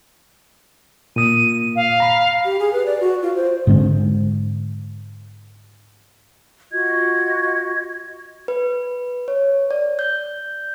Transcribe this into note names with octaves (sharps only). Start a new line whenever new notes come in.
A#2 D#6 D#7
F5
A#5 B5
G4
G#4
B4
D5
F#4
F4
C5
G#2 D3 G#3 C4
F4 F#4 D#5 G#6
B4
C#5
D5
G6